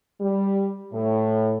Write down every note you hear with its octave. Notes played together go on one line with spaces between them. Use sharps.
G3
A2